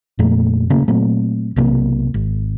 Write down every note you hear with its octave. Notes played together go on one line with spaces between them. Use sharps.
F2 A#2 A3
C#3 A3 A#3
A#2 F#3 A3 C4
B1 C3 A#3
G#1